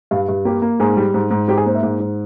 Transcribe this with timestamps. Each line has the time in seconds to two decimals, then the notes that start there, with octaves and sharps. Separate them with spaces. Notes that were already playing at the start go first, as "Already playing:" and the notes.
0.11 G2 F5
0.29 G2
0.45 A#3 G4
0.62 A#3
0.80 G#2 G#4
0.97 G3
1.14 G#2
1.31 G#2
1.48 G#2 G4
1.57 G#4
1.66 A#3 C5
1.74 E5
1.83 G#2
2.00 G#2